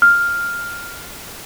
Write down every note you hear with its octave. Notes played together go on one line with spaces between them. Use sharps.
F6